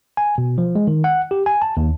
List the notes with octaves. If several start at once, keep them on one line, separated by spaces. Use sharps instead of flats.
G#5
B2
F3
G#3
D#3
F#5
G4
G#5
A5
D#2